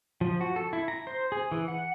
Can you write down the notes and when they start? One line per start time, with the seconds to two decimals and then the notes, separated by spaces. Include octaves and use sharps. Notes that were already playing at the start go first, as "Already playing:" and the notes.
0.21 F3
0.41 F#4
0.56 A4
0.73 E4
0.88 A#5
1.07 C5
1.32 G#4
1.52 E3
1.68 F#5